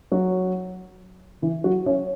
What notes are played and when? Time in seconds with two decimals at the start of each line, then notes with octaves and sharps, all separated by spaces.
0.12 F#3 F#4
1.42 E3 E4
1.64 F#3 F#4
1.86 C#4 C#5